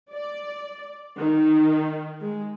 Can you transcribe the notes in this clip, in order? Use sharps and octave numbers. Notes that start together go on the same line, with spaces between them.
D5
D#3
G#3